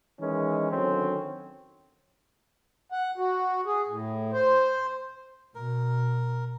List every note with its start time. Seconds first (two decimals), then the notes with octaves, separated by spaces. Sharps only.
0.19 D#3 E3 G#3 C#4 D#4
0.71 D3 D#3 F#3 C4 C#4
2.92 F#5
3.17 F#4
3.66 G#4
3.88 A2
4.33 C5
5.55 B2 A#4